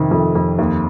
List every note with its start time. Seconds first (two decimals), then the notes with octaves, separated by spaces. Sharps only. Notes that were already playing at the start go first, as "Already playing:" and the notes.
Already playing: F2 C3 D#3
0.11 F2
0.35 F2
0.59 D#2